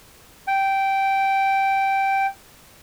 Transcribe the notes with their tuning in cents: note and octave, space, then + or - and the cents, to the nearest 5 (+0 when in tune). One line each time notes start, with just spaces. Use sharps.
G5 -10